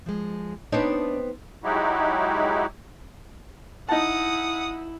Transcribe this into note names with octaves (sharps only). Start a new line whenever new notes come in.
F3 G#3
B3 C4 D4 D#4 C#5 A5
F#3 G#3 D#4 E4 F#4 G4
D#4 E4 F#5 A5 D#6